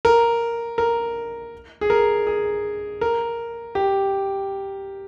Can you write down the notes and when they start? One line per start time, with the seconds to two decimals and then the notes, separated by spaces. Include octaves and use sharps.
0.05 A#4
0.78 A#4
1.81 G#4
1.90 A#4
2.27 G#4
3.01 A#4
3.75 G4